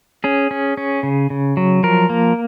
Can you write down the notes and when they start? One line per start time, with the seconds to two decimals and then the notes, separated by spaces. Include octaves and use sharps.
0.24 C#4 G#4
0.51 C#4
0.77 C#4
1.03 C#3
1.30 C#3
1.57 F#3
1.83 F3 A#4
2.10 A#3